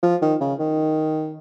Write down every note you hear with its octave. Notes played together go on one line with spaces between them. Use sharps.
F3
D#3
C#3
D#3